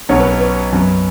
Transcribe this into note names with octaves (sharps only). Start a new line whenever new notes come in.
B1 B2 F#3 C#4 C#5
B4
B4
B4
F#2 F#3 B3